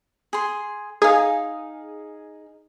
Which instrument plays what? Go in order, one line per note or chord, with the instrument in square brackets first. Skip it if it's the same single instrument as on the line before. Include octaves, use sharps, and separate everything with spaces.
[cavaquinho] G#4 C6
[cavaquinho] D#4 F5 [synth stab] G#4